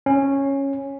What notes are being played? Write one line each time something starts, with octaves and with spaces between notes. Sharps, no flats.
C#4